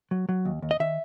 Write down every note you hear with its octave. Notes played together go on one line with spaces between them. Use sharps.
F#3
F#3
D#2
D#2
D#5
D#3 E5